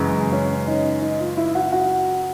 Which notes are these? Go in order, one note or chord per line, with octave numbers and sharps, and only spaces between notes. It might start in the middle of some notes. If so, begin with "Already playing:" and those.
Already playing: F#2 C#3 E3 G#3
C#4
D#4
D#4
F4
E4
F#4
F#4